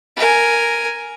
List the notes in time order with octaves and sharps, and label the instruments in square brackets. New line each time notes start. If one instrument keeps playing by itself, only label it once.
[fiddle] A#4 G#5